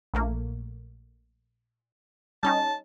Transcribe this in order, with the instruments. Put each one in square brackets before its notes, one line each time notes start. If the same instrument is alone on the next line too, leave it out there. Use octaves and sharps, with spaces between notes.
[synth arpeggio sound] A#1 A3 A#3
[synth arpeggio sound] G3 C#4 D#4 [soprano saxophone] A5